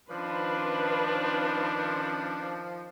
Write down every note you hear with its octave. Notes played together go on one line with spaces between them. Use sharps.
D#3 F3 C#4 D4 B4 C5